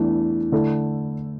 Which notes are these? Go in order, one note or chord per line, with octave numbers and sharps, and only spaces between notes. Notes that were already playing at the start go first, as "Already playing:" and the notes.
Already playing: E2 E3 A3 D4
D3 A3 E4 A4